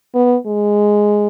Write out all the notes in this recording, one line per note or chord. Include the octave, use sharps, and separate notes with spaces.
B3
G#3